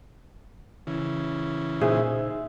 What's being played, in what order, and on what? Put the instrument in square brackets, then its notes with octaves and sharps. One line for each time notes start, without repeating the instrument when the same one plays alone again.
[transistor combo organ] C#3 E3
[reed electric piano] A#2 D#4 C5 [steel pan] G#4 [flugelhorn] E5